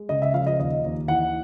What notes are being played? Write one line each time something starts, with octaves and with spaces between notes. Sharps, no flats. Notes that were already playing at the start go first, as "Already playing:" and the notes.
Already playing: G#3
C#3 D#5
E5
F3 F5
D#5
D#2 D#5
D#2
E3 F#5